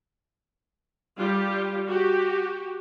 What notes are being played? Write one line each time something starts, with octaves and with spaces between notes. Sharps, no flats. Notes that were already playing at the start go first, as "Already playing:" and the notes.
G3 F4 G4
F#4 G4